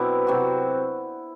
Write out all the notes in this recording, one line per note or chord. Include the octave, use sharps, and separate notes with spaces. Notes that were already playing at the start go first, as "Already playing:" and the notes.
Already playing: B2 F#3 C4 D4 E4 D5
C3 F#3 C4 F#4